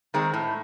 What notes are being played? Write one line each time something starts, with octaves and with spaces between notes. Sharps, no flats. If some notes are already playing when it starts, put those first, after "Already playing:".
D#3 G#3 C4
A2